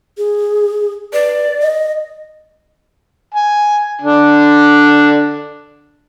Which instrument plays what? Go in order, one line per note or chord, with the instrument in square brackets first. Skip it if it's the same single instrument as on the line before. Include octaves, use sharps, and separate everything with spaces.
[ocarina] G#4
[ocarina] B4 [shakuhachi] D5
[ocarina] D#5
[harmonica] G#5
D3 D4